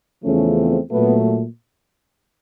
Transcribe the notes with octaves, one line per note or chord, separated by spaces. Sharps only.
E2 C#3 F3 A3 C#4
C4
A#2 F#3 A3 B3